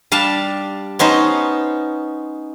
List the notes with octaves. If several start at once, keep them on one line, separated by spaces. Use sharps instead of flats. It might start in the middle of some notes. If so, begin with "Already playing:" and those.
G3 D4 F5 A5
B3 C#4 D#4 C5